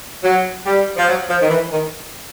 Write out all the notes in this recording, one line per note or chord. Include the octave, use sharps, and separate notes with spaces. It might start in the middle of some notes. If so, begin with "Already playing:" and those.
F#3
G3
F3
F#3
F3
D#3
E3
D#3